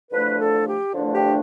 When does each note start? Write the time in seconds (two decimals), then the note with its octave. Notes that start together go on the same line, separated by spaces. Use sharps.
0.11 E2 D3 F3 A3 D4 B4
0.39 A4
0.67 G4
0.93 E2 D3 F3 A3 D4
1.15 G4